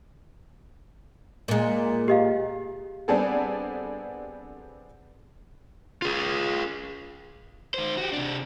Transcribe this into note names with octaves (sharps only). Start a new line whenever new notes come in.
A#2 G#3
G4 D#5 F5
G3 B3 C4 D4 G#4 A4
F4 G#4
D#3 C5
F#4 G4
C3 D4